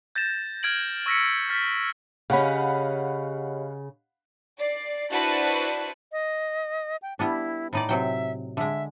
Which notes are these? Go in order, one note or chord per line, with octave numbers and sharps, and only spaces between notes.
G6 A6 A#6 E7
F6 G#6 D7 F#7
C#6 E6 A#6 B6 C#7
F6 A6 B6
C#3 C#4 G4 C#5 D#5 F5 F#5 B5
D5 C7
D4 E4 F#4 B4 C5 A5
D#5
G5
G3 B3 D4 E4
A2 D#4 D5 B5
C3 F#3 E5 G5
D3 G#3 E5